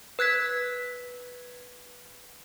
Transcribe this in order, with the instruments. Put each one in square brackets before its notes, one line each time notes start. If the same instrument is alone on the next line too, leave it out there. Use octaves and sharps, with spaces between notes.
[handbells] B4 F#6 G#6 B6